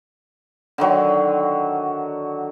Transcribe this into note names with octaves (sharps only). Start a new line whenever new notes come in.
D3 D#3 F#3